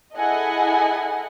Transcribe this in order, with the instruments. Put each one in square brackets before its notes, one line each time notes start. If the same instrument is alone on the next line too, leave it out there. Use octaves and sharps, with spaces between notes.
[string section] E4 G#4 A4 D#5 F#5 G#5